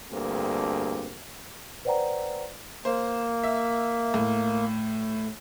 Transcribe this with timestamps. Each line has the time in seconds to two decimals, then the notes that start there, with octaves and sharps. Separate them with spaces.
0.12 D2 G2 A#3 C4 G#4
1.85 B4 C5 D5 F#5 G5 A#5
2.85 A#3 C5
3.44 E5
4.14 A2